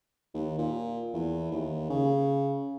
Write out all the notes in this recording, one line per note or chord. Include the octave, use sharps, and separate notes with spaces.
D#2
A#2
E2
D#2
C#3